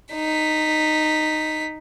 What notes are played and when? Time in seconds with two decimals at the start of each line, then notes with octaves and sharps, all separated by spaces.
0.14 D#4 B6